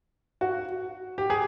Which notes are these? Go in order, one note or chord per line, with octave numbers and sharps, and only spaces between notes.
F#4
G4
G#4